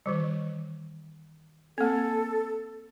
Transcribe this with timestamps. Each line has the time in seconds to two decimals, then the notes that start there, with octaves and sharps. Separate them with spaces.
0.06 D#3 E3 G3
1.78 A#3 C4 A4